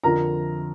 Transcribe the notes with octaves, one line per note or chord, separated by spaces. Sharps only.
F2 D3 F3 A#4 A#5